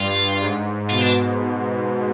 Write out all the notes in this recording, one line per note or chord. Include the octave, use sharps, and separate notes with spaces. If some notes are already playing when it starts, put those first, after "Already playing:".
Already playing: G2 F4
G#2
B2 F4
D4